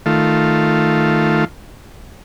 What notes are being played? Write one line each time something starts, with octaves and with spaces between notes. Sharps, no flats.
D#3 A3 F4